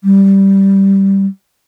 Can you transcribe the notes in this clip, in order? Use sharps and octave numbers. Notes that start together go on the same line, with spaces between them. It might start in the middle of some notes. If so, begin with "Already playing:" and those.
G3